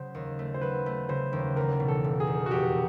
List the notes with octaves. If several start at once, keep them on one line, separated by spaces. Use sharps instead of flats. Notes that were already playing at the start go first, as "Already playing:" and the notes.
Already playing: C#3 F#3 C5
D#2
A3
C5
F#3 B4
A3
C#3 C5
D#2
E2 A#4
B2
A4
F1
G#4
E2
F#4
F1 G4